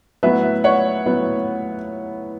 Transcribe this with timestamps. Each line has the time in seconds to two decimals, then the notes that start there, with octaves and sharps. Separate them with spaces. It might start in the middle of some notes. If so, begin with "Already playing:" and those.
0.23 A2 F#3 B3 B4 E5
0.64 C#5 F#5
1.05 A2 F#3 B3